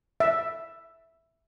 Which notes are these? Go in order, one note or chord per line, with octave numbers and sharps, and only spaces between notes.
E5